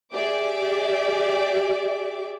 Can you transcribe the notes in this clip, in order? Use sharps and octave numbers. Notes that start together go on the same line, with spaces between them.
G4 G#4 D5 E5 D6